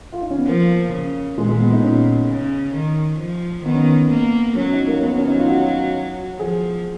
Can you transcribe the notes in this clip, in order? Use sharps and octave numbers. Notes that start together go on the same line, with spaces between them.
F4
D#4
C#4
B3
F3 A#3
C#3
A#2 G#3
G#3
B3
D#4
A#2 C#4
C#3
D#3
F3
D#3 B3
C#4
B3
A#3
F#3 C#4
D#4
A#3
F#3 B3
C#4
D#4
F4
F#4
F3 G#4